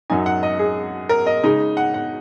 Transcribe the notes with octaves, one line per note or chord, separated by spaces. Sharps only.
F#2 F#3 D#4 G#5
F#5
D#5
G#4
A#4
D#5
C#3 G#3 D#4
F#5
F#5